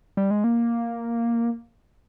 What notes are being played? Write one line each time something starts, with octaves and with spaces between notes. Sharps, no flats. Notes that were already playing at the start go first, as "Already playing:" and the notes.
G3
G#3
A#3